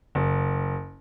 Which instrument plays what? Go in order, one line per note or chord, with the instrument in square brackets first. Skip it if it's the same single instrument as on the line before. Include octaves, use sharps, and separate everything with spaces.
[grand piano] F#1